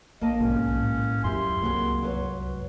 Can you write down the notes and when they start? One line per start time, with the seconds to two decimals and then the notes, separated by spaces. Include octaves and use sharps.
0.21 A#1 A#3 D#5 A5
0.40 B1 G#2 C#4
0.71 A2
1.24 C#2 F#2 E4 G4 C6
1.62 C2 F#2 A#3 F#4 G#4
2.02 F#3 B4 C#5